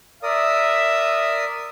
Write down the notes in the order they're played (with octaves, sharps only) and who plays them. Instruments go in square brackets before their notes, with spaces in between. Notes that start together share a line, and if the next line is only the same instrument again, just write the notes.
[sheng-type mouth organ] A#4 D5 D#6 [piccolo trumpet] E5